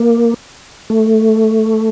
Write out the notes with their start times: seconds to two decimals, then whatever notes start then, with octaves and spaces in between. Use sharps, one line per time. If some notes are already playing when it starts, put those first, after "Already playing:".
Already playing: A#3
0.90 A3